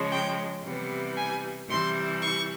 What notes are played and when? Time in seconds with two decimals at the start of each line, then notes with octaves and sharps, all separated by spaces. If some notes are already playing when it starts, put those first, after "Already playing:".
Already playing: C#3 F3 G#3
0.11 G5
0.63 C3 E3 G3 B3
1.16 G#5
1.68 C3 E3 G3 C6
2.21 C#6